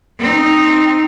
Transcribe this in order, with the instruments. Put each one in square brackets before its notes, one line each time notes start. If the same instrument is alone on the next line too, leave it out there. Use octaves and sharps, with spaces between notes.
[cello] C4 D#4